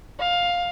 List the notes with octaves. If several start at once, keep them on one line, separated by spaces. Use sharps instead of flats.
F5